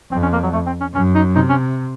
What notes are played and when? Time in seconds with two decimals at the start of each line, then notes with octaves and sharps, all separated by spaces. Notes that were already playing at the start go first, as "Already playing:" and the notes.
0.12 F2 C4
0.22 C#4
0.32 A#3
0.43 F#3
0.53 A3
0.66 C4
0.81 C#4
0.94 F#2 C#4
1.15 D#4
1.35 C3 D#4
1.49 C#4